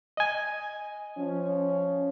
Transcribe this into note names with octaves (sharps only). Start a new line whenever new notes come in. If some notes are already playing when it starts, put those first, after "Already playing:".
D#5 G#5
F3 C#4